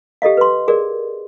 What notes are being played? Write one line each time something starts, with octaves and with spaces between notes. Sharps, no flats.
G4 A4 D#5 F5
B4 C6
G#4 A#4 D5